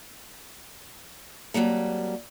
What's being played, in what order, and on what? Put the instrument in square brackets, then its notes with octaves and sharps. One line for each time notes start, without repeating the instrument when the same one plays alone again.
[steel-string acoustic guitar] F2 D3 F#3 G3 A#3